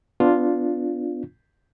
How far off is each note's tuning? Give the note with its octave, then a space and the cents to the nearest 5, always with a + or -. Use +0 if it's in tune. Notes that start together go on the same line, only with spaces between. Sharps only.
B3 +25 D4 +0 F4 +0